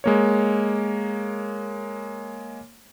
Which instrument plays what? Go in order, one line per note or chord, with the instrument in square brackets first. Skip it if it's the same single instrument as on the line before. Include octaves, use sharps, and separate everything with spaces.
[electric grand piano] G#3 A#3 C#5